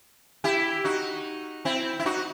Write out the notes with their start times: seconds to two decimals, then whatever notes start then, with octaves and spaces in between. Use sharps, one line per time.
0.44 E4 G4
0.84 D#4 F#4
1.65 C4 E4
1.99 E4
2.06 D#4 F#4